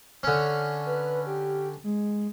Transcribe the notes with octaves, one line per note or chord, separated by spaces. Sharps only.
D3 C#4
B4
G4
G#3